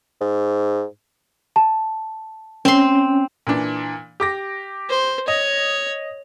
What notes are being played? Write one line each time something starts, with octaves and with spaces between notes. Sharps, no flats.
G#2
A5
C4 C#4 C6
A#2 E3 D4
G4 D6 A#6
C5
C#5 D#5